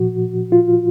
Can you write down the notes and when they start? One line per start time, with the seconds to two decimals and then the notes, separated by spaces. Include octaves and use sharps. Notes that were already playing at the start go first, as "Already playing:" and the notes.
Already playing: A#2 F3 F#4
0.52 F4